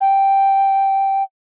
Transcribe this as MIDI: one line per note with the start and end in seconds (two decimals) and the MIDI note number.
0.01 1.23 79